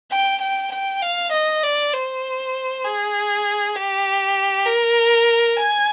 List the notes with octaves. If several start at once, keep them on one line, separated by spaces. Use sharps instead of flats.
G5
G5
G5
F5
D#5
D5
C5
G#4
G4
A#4
G#5